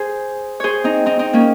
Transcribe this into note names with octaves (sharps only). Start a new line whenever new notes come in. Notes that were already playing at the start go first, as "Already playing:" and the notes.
Already playing: G#4 C5
G#4 C5 C#5
C4 D#4
C4 D#4
C4 D#4
A#3 C#4